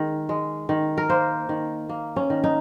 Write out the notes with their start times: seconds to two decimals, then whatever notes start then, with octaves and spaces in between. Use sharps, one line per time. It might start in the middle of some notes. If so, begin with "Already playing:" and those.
Already playing: D#3 G#3
0.29 G#3
0.69 D#3
0.98 A#4
1.09 A#3 C5
1.49 D#3
1.89 A#3
2.16 C#4
2.30 D#3
2.44 D#4